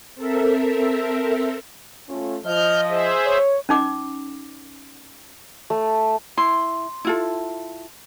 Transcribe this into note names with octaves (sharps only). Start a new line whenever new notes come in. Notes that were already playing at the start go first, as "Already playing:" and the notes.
C4 A4 A#4 E5
A3 C#4 F4
F3 D#5 F6 G6
G#4 C5 E5
C#5
C#4 D#4 D6
A3
E4 C6
E4 F4 A4